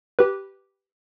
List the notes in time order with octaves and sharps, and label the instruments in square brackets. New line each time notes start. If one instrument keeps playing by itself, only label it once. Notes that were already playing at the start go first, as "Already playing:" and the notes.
[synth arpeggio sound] G4 B4